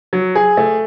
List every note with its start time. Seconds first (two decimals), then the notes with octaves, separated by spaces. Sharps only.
0.13 F#3
0.35 G#4
0.57 A3